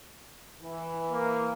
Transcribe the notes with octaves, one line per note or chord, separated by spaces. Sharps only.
E3
A#3